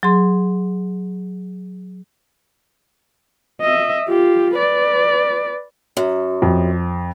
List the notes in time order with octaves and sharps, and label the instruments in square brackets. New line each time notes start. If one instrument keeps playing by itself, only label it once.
[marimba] F#3 G#4 C6
[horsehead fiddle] D#5 E5
F4 G4
B4 D5
[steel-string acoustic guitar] F#2
[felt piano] F2